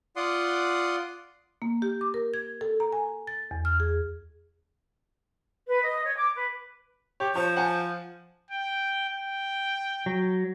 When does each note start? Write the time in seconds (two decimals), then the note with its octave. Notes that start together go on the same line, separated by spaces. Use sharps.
0.16 F4 D5 F#5 C6 D#6
1.62 A#3
1.82 G4
2.01 D6
2.14 A#4
2.34 G#6
2.61 A4
2.80 A#5
2.92 G#5
3.27 A6
3.51 E2
3.65 F6
3.80 G#4
5.68 B4
5.85 D#5
6.05 C#5
6.18 D6
6.35 B4
7.20 G4 C#5
7.35 F3 C5 C#5 A5 G6
7.56 F#5 G#5 A5
8.50 G5
9.09 G5
10.06 F#3